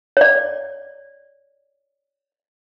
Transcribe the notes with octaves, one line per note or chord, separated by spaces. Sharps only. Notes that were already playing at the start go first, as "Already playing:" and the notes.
C#5 D5